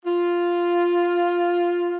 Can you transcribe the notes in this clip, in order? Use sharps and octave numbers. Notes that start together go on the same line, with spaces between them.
F4